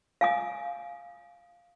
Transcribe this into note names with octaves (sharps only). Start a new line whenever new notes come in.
F5 G#5 D#6